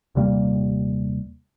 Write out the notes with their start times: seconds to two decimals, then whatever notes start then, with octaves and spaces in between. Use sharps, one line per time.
0.15 D#1 C3 G3 A#3